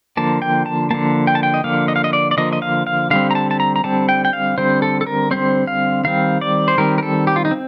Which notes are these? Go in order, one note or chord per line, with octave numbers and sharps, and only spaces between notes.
D3 F3 A#3 A5
G5
A5
D3 F3 A#3 A5
G5
A5
G5
D#5
D3 F3 A#3 F5
D#5
F5
D#5
D5
D5
D3 F3 A#3 D#5
D#5
F5
F5
D3 G3 C4 F5
A#5
A5
A5
A#5
A#5
D3 G3 C4 A5
G5
G5
F5
D3 G3 C4 C5
A4
A4
A#4
D3 G3 C4 C5
F5
D#3 G3 C4 F5
D5
C5
D#3 G3 C4 A#4
A#4
A4
G4
F4
D#4
C4